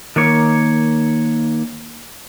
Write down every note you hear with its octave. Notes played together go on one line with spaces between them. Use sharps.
D#3 A#3 C#5